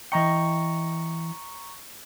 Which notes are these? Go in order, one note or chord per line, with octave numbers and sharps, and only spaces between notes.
E3 D#5 G5 A#5 C#6 C#7